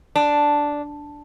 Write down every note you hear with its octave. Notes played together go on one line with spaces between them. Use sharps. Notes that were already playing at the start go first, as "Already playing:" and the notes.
D4